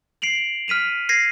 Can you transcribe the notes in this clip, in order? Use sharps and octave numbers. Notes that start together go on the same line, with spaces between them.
C7 D7 F7 F#7
F6 B6 D#7 F7
G#6 A#6 C7 D#7